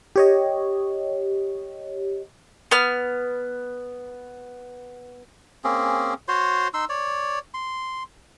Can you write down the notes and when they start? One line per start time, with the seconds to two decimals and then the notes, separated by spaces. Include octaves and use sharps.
0.16 G4 C#5 D#5
2.71 B3 F6
5.64 A#3 C4 C#4 G#4
6.28 F#4 C5 C#5 C6
6.74 D#4 C6 E6
6.89 C#5 D5
7.54 C6